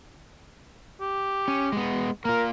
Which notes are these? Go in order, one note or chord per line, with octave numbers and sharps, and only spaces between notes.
G4
C#4
G#3 B3
A#3 F4 A#4